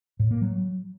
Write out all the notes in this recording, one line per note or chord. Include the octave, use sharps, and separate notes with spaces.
A2
A#3
F#3